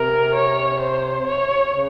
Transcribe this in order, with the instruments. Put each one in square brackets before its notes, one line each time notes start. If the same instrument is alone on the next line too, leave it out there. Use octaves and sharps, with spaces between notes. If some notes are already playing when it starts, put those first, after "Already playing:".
Already playing: [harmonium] C3 [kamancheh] A#4
[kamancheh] C#5
C5
C#5
[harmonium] C#3